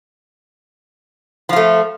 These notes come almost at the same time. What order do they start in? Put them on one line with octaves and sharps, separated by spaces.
F3 F4 A3